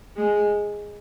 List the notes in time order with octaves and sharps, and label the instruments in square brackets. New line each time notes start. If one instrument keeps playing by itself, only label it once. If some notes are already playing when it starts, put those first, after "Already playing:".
[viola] G#3